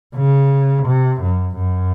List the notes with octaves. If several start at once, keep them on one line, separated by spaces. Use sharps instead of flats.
C#3
C3
F#2
F#2